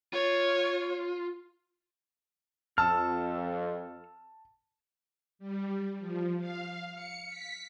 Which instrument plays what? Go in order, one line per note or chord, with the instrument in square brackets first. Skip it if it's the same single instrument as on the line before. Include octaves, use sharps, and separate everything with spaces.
[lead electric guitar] F4 [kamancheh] C#5
[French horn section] F2 [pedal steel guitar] A4 E6 F6 [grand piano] A5
[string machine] G3
F3
F5
C#7
B6